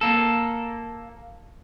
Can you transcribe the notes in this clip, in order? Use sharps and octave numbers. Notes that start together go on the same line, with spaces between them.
A#3 A4